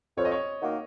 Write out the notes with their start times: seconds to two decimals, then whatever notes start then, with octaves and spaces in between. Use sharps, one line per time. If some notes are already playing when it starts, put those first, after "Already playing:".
0.17 F2 C#5
0.25 D#5
0.32 C#5
0.61 D#3 A#3 D#4 F#4